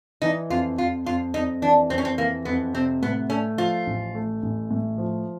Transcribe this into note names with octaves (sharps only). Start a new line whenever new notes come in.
E3 D#4
F2 F4
F2 F4
F2 F4
F2 D#4
E3 D4
F2 C4
C#4
C4
E3 A#3
F2 B3
C3 C4
A2 B3
A3 C#4
F3 F4
A1
A3
A1
A2
F3